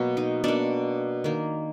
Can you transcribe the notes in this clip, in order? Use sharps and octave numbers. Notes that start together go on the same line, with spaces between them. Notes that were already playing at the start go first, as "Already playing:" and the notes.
Already playing: B2 F#3 A#3
D#4
B2 A#3 D4
D#3 A#3